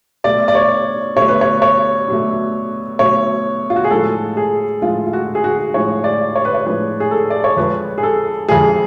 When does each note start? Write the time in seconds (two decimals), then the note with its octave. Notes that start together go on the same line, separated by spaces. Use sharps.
0.24 B2 F#3 A3 D5
0.48 D5
0.55 C#5
1.16 B2 F#3 A3 C#5
1.28 B4
1.41 C#5
1.62 C#5
2.08 B2 F#3 A3
2.99 B2 F#3 A3 C#5
3.70 F4
3.76 F#4
3.84 G#4
3.91 A2 F3 G#3 A4
4.37 G#4
4.82 A2 F3 G#3 F4
5.06 F4
5.13 F#4
5.35 G#4
5.44 F#4
5.74 A2 F3 G#3 C#5
6.04 D5
6.36 C#5
6.45 B4
6.55 C#5
6.66 A2 F3 G#3 B4
7.00 G#4
7.11 A4
7.30 D5
7.44 C#5
7.57 F2 F3 G#3 B4
7.98 G#4
8.03 A4
8.49 F2 F3 G#3 G#4